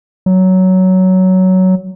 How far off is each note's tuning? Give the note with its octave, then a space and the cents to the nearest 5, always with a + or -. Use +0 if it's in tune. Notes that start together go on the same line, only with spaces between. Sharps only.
F#3 +10